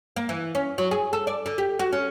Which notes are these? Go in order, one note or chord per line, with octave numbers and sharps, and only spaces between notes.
A#3
E3
C#4
F#3
G#4
A4
D5
D3
G4
F#4
C#4